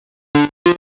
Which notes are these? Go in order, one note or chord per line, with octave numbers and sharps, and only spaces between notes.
D3
F3